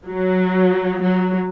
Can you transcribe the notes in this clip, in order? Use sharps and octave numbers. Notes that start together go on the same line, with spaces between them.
F#3
F#3